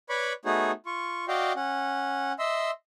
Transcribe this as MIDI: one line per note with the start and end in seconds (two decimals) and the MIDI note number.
0.09 0.33 71
0.09 0.33 73
0.09 0.33 74
0.09 0.33 83
0.09 0.33 85
0.45 0.72 57
0.45 0.72 59
0.45 0.72 63
0.45 0.72 66
0.45 0.72 68
0.45 0.72 73
0.86 1.25 65
0.86 1.25 85
1.28 1.53 66
1.28 1.53 74
1.28 1.53 75
1.28 1.53 77
1.28 1.53 79
1.56 2.33 61
1.56 2.33 78
2.39 2.71 75
2.39 2.71 76
2.39 2.71 84
2.39 2.71 88